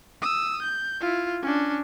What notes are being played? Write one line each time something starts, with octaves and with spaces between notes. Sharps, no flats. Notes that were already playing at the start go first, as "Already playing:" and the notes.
D#6 E6
G6
E4 F4
C#4 D4